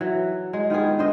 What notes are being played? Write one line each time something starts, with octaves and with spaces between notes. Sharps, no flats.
E3 F#3
G#3
D#3 B3 F4 G#4
D3 C5 D#5 E5